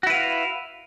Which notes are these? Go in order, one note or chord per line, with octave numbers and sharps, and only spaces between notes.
E4 F#4 B4 F5